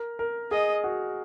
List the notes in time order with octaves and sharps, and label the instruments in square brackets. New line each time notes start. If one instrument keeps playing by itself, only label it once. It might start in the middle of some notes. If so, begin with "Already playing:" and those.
Already playing: [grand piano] A#4
A#4
[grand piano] G#4 [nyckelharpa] D#5
[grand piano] F#4